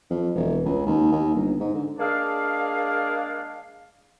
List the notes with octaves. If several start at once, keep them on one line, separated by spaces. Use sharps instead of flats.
F2
E1
C#2
D#2
D#2
G1
G#2
D3
G#3 A#3 D4 G#4 D5 F5